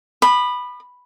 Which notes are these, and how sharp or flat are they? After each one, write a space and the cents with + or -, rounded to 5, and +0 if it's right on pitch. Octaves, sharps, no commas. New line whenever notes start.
B5 +0 D#6 -45